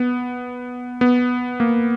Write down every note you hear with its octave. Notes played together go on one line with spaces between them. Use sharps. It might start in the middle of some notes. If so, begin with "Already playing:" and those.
Already playing: B3
B3
A#3